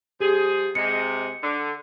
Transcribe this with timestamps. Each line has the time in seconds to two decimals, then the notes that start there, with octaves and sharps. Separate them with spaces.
0.20 F3 G3 G4 G#4
0.75 C3 G#3 C#7
1.43 D3